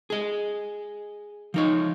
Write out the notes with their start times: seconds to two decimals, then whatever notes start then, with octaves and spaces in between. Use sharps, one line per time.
0.10 G#4 D#5
1.54 F3 D#4 C#5